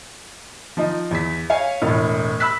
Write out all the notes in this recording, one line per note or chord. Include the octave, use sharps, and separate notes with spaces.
F3 D#4
E2 B6
C#5 F5 G#5
E1 A2
B5 E6 F#6 B6